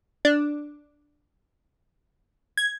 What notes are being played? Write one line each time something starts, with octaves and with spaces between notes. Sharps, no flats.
D4
G#6